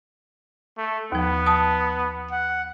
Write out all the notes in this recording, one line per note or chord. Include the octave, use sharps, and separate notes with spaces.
A3
D#2 F3 B3
A5 D#6
F#5